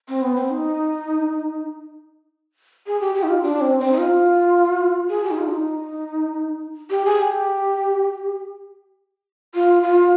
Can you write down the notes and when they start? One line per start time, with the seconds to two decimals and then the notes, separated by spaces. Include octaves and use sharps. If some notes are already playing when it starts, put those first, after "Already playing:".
0.09 C4
0.22 B3
0.37 C4
0.51 D#4
2.87 G#4
3.01 G4
3.15 G4
3.23 D#4
3.29 F4
3.43 D4
3.61 C4
3.80 C4
3.92 D#4
3.98 F4
5.09 G#4
5.24 G4
5.31 D#4
5.38 F4
5.47 D4
5.51 D#4
6.90 G4
7.05 G#4
7.19 G4
9.55 F4
9.83 F4